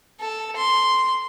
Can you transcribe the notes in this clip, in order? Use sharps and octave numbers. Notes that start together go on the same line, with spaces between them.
A4
C6